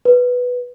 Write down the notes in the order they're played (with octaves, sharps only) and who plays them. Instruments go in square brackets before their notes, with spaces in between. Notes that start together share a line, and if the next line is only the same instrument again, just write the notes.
[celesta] B4